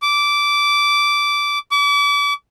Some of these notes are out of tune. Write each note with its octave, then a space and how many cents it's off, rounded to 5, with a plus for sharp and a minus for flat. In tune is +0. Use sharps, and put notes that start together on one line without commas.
D6 -15
D6 -40